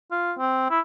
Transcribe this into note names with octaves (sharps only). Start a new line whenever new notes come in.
F4
C4
E4